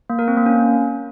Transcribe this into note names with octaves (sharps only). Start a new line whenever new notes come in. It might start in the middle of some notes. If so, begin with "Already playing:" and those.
A#3
A#4
C4
A#3
C#4